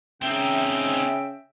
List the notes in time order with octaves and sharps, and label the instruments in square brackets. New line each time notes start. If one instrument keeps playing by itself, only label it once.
[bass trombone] C#3 [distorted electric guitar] C4 D#4 [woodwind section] E5 G5